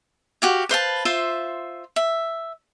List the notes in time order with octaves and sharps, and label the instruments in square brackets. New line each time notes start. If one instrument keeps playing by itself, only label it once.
[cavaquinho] F#4 G4 F5
B4 C5 F5 A5
F4 C5 E5
E5